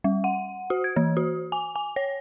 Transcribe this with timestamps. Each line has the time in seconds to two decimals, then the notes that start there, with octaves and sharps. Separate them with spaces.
0.04 G3
0.24 F#5
0.70 F#4
0.84 G#6
0.96 E3
1.17 F#4
1.52 G#5
1.76 G#5
1.96 C#5